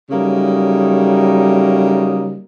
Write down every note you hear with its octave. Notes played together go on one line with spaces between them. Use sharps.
C#3 F#3 G3 A3 A#3 D#4